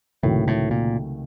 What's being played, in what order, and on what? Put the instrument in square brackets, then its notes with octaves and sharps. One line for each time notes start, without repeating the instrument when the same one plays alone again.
[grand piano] C#2 C3 D#3 F#3 A3 [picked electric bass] A2
[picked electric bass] A2
A#2